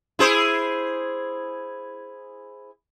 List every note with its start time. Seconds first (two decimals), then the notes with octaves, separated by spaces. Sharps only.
0.19 E4 G#4 C5